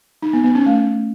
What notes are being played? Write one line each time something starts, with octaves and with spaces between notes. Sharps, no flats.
D#4
B3
B3
C#4
A3